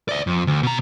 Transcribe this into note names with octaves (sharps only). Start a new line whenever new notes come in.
D5 E5
F2
D2
B2 A#5